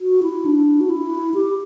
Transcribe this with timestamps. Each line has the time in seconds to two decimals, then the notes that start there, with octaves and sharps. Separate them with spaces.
0.01 F#4
0.23 E4
0.45 D4
0.81 F#4
0.90 E4
1.34 G4